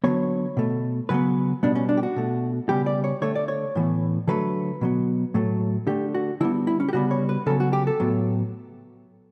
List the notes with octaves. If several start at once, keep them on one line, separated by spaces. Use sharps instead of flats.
D3 F#3 B3 C#5
B2 A3
C#3 F#3 B3 B4
B2 G3 B3 D4
C#4
D4
G4
F#4
B2 A3
C#3 G3 B3 G4
D5
C#5
D3 A3 C#5
D5
C#5
A2 E3 B3
D3 F#3 A3 B4
B2 F#3 B3
A2 F#3 A3
D3 A3 G4
F#4
D3 G3 B3 E4
E4
C#4
G4
C#3 G3 B3 F#4
C#5
B4
C#3 F#3 B3 A4
F#4
G4
A4
A2 F#3 B3